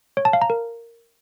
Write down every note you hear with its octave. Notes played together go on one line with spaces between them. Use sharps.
C#5
A5
F5
A#5
A#4